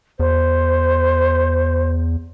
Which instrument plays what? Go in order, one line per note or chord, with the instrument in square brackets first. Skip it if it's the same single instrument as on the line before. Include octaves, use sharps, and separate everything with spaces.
[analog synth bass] E2 [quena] C5